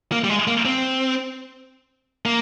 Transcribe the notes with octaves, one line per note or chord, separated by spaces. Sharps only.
A#3
G3
G#3
A#3
C4
A#3